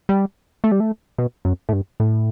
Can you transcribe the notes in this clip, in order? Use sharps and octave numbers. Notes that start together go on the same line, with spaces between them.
G3
A3
G3
A3
B2
F#2
A2
G2
A2